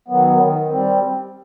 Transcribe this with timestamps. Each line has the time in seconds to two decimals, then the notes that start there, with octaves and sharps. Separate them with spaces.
0.08 D#3 F#3 B3
0.38 D#3
0.69 G3 C4